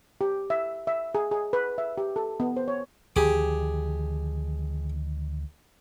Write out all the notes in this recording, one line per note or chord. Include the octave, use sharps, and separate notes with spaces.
G4
E5
E5
G#4
G#4
B4
E5
G4
A4
B3
C5
C#5
D2 D#3 F3 G4 G#4 D6